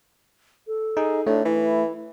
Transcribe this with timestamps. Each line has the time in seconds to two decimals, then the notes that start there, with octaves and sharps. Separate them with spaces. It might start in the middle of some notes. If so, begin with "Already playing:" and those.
0.67 A4
0.97 D#4 G#4
1.27 A2 A3 D4
1.45 E3 E4